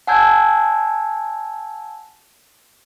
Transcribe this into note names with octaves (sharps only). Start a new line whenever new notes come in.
F#5 G#5 A5 E6 G6 G#6